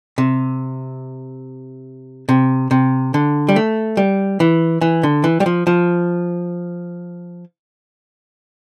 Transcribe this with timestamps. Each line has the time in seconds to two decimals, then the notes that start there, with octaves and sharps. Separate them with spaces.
0.18 C3
2.29 C3
2.71 C3
3.14 D3
3.49 G3
3.56 A3
3.97 G3
4.40 E3
4.81 E3
5.03 D3
5.24 E3
5.40 G3
5.46 F3
5.67 F3